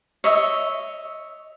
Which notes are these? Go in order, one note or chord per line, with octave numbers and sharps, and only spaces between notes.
C#5 D#5 E5